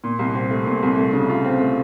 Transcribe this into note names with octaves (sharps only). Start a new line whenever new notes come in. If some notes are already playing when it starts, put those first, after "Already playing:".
A#2
C2
C4
A3
A#2
C2
A3
C#3
F4
C4
A3